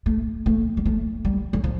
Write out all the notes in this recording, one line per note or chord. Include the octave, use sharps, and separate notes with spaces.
A3
A3
G3
A3
G3
G3
F3